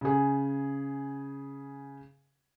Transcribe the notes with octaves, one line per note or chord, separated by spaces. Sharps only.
C#3 G#4